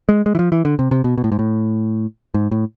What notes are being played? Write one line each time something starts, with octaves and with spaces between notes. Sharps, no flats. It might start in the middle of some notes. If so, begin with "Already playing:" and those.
G#3
G#3
E3
F3
E3
D3
C3
C3
B2
B2
A2
G#2
A2
G#2
A2